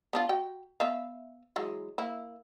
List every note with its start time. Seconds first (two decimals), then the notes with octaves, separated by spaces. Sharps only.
0.13 B3 D4 F4
0.29 F#4 G5
0.80 B3 E5 F5
1.56 E3 F#3 G#3
1.98 A#3 E4